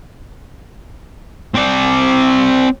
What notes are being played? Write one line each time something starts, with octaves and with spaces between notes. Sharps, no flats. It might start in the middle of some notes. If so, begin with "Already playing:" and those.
C4 D5